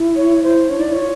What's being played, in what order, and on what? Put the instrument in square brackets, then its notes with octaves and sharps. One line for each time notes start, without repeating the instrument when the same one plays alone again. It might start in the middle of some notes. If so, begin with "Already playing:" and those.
Already playing: [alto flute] E4
[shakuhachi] C#5
C5
[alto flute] D4 [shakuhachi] C#5
[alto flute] D#4 [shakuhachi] D5
[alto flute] E4
[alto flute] F4 [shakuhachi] C#5